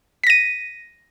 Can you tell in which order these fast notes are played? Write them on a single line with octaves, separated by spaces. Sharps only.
B6 A#6 D#7